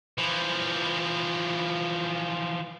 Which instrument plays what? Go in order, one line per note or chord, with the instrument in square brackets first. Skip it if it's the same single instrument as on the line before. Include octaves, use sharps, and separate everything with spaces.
[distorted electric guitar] E3 F3